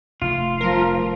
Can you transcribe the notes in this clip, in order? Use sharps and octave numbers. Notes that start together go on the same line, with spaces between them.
F1 A3 F4
F3 A#4